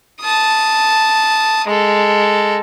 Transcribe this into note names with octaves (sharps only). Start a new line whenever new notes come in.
A5 D#6
G#3 A4